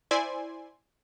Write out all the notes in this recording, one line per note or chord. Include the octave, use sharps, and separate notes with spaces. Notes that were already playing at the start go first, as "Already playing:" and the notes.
E4 C5 D5 G#5 C6